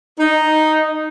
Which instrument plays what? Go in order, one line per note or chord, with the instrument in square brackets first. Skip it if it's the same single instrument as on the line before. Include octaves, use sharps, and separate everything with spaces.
[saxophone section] D#4